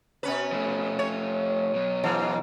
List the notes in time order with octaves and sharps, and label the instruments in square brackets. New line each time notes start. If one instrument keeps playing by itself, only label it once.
[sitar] B2 C#4 B4
[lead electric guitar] F3 A3
[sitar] C#5
[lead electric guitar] B2 F#3
[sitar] G#2 E3